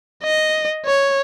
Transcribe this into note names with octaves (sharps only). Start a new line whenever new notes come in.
D#5
C#5